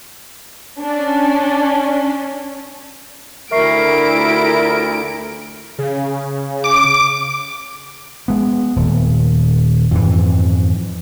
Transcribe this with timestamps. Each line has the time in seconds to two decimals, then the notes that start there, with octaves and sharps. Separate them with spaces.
0.80 C#4 D4
3.51 D2 E4 A#4 E5 C#6 C7 D7
4.15 F4 A4 A#4
5.79 C#3
6.64 D6
8.28 G#3 B3
8.76 D#1
9.91 F2 G#2 E3